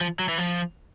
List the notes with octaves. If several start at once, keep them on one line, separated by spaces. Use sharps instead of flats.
F3
F#3
E3
F3